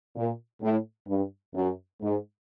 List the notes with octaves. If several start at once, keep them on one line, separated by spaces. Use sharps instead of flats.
A#2
A2
G2
F#2
G#2